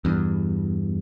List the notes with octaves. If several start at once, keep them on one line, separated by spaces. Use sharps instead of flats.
E2 G2